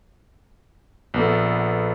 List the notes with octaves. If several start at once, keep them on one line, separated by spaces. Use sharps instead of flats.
A#1 B3 A4